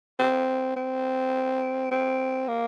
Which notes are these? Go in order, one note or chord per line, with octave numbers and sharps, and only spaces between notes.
C4
C4
C4
A#3